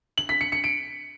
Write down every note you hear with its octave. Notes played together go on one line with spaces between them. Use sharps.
F#7
B6
C#7
C#7
D7